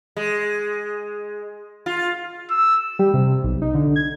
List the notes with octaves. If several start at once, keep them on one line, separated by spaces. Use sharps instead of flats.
G#3
F4
E6
G3
C3
B1
D#4
D3
G#6